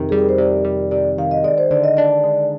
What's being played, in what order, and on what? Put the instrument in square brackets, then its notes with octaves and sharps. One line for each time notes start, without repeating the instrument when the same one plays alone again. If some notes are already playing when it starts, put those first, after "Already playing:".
Already playing: [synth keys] F2 C3 D#3
[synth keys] G3 [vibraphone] G#4
[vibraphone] A#4
C5
[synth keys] C3 [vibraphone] D5
[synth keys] G3
[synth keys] C3 [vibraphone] D5
[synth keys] D#3 [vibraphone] F5
[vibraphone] D#5
[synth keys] G#3 [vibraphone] D5
[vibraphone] C5
[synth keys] D3 [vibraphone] D5
[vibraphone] D#5
[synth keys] D4 [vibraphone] D5
[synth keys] G#3